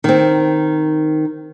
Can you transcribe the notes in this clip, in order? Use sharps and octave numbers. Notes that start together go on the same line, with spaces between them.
D#3 C4